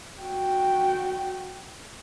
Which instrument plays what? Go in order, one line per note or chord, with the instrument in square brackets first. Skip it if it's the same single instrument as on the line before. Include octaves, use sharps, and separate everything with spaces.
[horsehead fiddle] F#4 G5